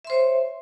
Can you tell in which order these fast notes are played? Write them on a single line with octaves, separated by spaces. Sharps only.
E5 C6 C5 C#5